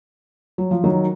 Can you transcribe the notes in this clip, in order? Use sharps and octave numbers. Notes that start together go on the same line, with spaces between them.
F#3
F3
D#3 F#3